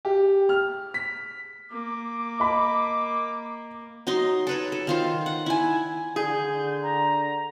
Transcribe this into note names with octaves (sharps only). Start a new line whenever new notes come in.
G4
F6
B6
A#3 D6
D#5 B5
F#3 D#4 D#5 C6
A4 B4 C#5
A4
D#3 F4 C5
F#5
E4 G#5
D3 G#4 G6
A#5